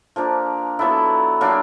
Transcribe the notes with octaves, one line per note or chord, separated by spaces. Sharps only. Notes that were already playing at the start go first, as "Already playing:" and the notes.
F3 A#3 D4
F#3 B3 E4 A4
F#3 A#3 D4